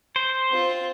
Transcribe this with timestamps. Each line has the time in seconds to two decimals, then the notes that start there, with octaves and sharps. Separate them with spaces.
0.16 C5
0.51 C4 F4